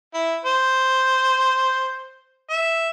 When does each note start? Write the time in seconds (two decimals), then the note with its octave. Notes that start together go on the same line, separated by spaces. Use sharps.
0.14 E4
0.45 C5
2.50 E5